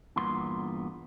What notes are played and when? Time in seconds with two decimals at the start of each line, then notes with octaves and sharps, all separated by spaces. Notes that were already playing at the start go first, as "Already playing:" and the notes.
0.16 E2 G2 A#2 B3 C6